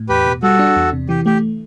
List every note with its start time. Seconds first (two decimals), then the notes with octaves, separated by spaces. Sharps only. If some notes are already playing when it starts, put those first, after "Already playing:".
Already playing: A2
0.09 E2 G4 B4
0.26 B2
0.43 G3 F#4 A4
0.59 D4
0.76 E2
0.93 C3
1.09 E3 G4
1.26 A3 G4